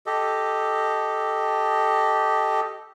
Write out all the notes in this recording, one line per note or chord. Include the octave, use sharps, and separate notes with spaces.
G4 A4 D#5